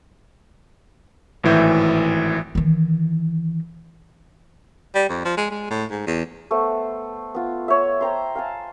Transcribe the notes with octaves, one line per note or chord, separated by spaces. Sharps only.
G#1 A2 E3 E5 G6
D#3 E3
G3
F2
F3
G#3
G#3
A2
G#2
E2
A3 B3 C5
B3 F4
C#5 E5
C5 G5 A#5 C6
F5 G#5 A5